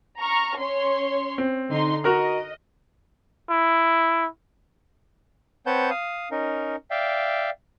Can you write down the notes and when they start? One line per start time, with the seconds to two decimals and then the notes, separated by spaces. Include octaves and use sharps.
0.20 A#5 C#6 F6
0.59 C#4 C#5 C6
1.38 C4
1.70 D3 D#4 C6
2.04 F#4 A#4 D#5 F6
3.50 E4
5.66 C4 B4 C#5 F#5 A5 G6
5.90 F5 D#6
6.31 C#4 D#4 A#4
6.91 D5 E5 F5 G5